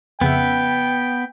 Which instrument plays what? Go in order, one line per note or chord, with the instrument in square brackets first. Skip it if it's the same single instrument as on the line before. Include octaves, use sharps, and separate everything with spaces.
[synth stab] F2 C#3 E5 [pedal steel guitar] B3 [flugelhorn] G5